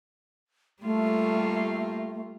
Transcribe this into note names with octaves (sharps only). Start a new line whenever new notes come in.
G3 A3 A#3 F4